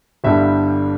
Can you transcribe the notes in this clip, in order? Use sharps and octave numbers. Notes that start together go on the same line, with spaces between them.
G1 G2 D3 G3 E4 E5